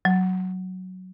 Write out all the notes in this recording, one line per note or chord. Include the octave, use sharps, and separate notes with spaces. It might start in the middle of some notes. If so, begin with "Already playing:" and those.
F#3